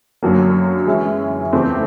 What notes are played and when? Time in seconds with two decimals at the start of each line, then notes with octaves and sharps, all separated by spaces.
0.23 F#2 D3 F#3 A#3
0.87 E3 G#3 C#4 E4 G#4
1.53 E2 C#3 E3 A3 C4